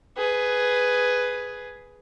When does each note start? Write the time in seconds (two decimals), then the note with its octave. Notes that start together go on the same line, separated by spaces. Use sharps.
0.17 G#4 B4